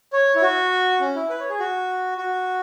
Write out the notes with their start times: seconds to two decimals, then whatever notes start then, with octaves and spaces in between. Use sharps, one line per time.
0.13 C#5
0.35 E4
0.42 F#4
1.00 C#4
1.16 E4
1.30 B4
1.40 C#5
1.50 G#4
1.59 F#4
2.18 F#4